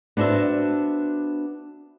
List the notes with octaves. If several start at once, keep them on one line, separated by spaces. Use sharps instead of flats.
B3 D4 F#4 C5 E5